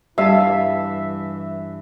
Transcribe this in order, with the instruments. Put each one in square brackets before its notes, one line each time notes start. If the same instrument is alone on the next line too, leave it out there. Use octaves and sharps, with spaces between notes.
[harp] G2 A5 [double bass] E3 [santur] E5 [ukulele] F5